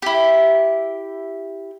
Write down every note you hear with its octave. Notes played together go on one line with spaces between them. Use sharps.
E4 G4